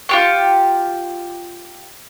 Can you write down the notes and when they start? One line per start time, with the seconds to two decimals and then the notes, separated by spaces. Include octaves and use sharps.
0.09 F4 G4 C#6